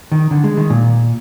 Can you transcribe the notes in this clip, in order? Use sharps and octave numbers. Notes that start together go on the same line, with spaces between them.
D#3
D3
G#3
D#3
A#2